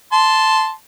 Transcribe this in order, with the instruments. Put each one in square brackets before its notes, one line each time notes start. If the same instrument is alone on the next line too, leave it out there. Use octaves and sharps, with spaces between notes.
[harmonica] A5 C6